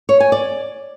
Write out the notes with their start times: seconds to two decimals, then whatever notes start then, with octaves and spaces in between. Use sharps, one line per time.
0.09 C#5
0.20 G#5
0.32 D5